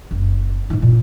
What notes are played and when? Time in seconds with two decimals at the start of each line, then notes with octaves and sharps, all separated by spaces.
0.11 F#1
0.70 G#2 E4
0.82 A#2